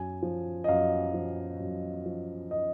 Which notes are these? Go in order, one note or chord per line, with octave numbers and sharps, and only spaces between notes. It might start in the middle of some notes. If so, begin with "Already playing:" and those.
Already playing: F#2 G#5
F3
D#5
F#2 F5
F3
F#2
F3
D#5